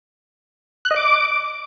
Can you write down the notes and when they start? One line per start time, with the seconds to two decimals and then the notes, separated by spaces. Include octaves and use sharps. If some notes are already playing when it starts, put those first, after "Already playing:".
0.85 F#6
0.91 D#5
0.96 D6